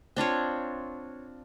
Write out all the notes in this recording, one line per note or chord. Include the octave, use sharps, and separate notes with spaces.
C4 D4 F4 C#5